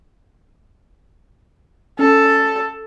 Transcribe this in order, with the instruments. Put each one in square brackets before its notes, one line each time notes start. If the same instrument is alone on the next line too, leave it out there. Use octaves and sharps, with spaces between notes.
[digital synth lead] C#4 [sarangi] A4